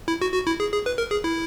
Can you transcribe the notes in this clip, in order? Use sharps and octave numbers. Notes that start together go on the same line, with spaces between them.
E4
F#4
F#4
E4
G#4
G#4
B4
A#4
G#4
E4